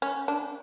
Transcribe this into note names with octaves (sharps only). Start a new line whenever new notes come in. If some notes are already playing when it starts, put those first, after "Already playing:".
C#4
D4